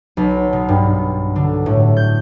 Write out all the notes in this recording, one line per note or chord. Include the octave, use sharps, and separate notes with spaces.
B1
B2
G2
D3
A2
G6